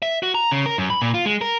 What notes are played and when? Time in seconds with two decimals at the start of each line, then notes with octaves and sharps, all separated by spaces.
0.02 E5
0.23 F#4
0.35 A#5
0.52 C#3
0.66 A#4
0.78 F#2
0.90 B5
1.02 A#2
1.14 F4
1.26 G#3
1.41 A#4